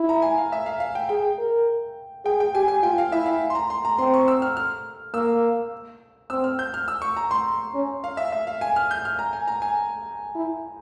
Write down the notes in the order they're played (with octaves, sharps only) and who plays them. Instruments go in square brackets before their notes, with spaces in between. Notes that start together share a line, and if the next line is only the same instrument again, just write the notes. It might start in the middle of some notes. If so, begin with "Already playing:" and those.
Already playing: [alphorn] E4
[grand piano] A#5
G#5
F5
E5
F5
F5
G5
[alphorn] G#4 [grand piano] G5
[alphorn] A#4
[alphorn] G#4 [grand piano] G5
[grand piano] G5
[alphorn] G4 [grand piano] G#5
[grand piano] G#5
[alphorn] F4 [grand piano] G5
[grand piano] F5
[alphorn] E4 [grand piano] E5
[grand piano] F5
C6
A#5
C6
A#5
[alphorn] C4 [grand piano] C6
[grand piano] C#6
E6
F6
F6
[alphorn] A#3 [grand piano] E6
[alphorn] C4 [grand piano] E6
[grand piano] F6
G6
F6
E6
C#6
A#5
C6
[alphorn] C#4
[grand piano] F5
E5
E5
F5
G#5
F6
G6
F6
A#5
G#5
A#5
G#5
[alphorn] E4